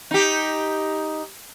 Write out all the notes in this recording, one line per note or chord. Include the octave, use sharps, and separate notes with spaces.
D#4 G4